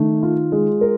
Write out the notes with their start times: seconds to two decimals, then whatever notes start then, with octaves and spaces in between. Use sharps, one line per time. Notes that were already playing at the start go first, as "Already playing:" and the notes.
Already playing: D#3 A3
0.23 F4
0.52 G#3
0.81 A#4